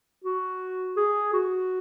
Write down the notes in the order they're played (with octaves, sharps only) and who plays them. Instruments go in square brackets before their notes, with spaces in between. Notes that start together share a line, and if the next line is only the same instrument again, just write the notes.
[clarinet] F#4
G#4
F#4